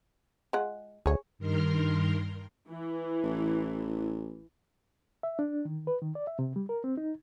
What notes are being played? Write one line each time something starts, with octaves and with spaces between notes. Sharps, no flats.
G#3 F4 F#5
D2 G#4 C#5
G2 D#3 A#4 C6 F6
E3
A1
E5
D4
D#3
B4
D#3
D5
E5
C3
G3
A#4
C4
D#4